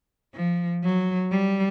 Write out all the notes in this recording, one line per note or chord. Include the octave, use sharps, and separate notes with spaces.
F3
F#3
G3